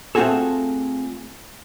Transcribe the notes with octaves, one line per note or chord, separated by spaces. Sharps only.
A3 C4 F4 F#4 G#4 A4